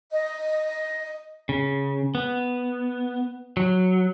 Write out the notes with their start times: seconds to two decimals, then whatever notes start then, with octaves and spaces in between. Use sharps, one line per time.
0.11 D#5
1.49 C#3
2.15 B3
3.57 F#3